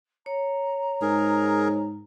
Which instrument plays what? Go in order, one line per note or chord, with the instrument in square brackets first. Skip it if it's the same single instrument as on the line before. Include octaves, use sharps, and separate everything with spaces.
[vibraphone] C#5 [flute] A#5
[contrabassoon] G#2 [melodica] G#4 A#4